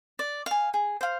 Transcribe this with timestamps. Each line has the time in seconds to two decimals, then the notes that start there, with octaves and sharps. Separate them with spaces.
0.19 D5
0.46 F5 G#5
0.74 G#4
1.01 C5 F5